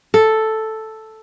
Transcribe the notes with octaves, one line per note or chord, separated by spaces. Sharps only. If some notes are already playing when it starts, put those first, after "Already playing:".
A4